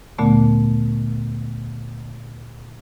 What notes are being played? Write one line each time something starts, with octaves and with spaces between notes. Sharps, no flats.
D2 A#2 D3 A3 B3